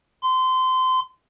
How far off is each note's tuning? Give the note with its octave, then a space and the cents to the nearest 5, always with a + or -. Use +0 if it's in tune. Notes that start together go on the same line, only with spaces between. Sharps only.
C6 -25